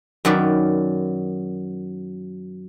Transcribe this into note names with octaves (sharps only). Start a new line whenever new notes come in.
F#2 D#3 F#3 B4 D5